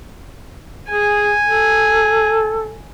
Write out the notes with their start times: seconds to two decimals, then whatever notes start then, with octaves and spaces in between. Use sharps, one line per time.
0.89 G#4 G#5
1.45 A4